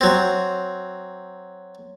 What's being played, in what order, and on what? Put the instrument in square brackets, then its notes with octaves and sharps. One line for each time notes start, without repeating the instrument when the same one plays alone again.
[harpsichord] F#3 C4